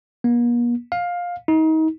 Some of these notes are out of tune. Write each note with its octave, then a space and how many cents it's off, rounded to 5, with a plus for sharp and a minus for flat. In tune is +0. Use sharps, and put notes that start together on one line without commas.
A#3 +45
F5 +15
D#4 +30